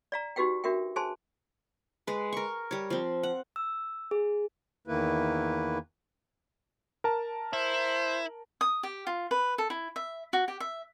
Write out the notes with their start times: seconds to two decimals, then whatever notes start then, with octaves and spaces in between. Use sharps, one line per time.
0.12 D5 F5 A#5
0.36 D#4 F#4 G4 B4 F5 G5
0.64 D4 F#4 A#4 E5 G5
0.96 G#4 C5 G#5 A5 C6
2.07 G#3 B4
2.32 A#4 C#6
2.71 G3 C#5
2.90 F3 C4
3.23 F#5
3.56 E6
4.11 G#4
4.87 E2 D#3 A#3 E4 B4
7.04 A#4 A5
7.53 E4 C5
8.61 D#6
8.83 G4
9.07 F4
9.31 B4
9.58 A4
9.70 E4
9.96 E5
10.33 F#4
10.48 G4
10.60 E5